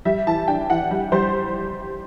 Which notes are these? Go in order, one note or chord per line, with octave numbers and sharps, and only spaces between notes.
G3 E5
E3 A5
D4 G5
E3 F#5
G3
G3 C5